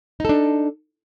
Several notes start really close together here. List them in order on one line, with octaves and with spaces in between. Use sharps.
D#4 A4 D4